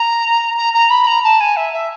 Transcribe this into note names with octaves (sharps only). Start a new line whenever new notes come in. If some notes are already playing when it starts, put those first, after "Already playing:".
Already playing: A#5
A#5
A#5
B5
A#5
A5
G#5
E5
E5